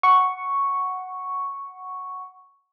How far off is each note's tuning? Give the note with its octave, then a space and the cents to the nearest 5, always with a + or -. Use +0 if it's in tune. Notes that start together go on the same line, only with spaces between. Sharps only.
F#5 +0 C#6 +0